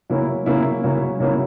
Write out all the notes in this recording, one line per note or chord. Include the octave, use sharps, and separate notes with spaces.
C#3 F#3 A#3 C#4 E4
C#3 F#3 A#3 C#4 E4
C#3 F#3 A#3 C#4 E4
C#3 F#3 A#3 C#4 E4